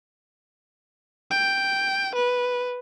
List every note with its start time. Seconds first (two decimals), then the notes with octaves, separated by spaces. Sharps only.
1.31 G5
2.15 B4